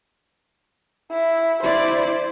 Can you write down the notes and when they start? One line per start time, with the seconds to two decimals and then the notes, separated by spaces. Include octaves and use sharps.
1.11 E4
1.63 E4 C5 D5